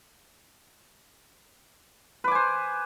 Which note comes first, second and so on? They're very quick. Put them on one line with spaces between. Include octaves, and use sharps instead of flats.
B4 D6 G#5 C5